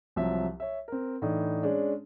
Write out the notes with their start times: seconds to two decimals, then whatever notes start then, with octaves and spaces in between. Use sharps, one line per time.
0.16 C2 F3 F#3 E5
0.60 C#5 E5
0.88 C4 A#4
1.22 A2 E3 D4 D#4
1.63 G#3 C#4 D4